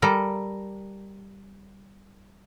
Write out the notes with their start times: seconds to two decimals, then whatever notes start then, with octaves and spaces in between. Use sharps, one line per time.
0.02 G3 A4 A#4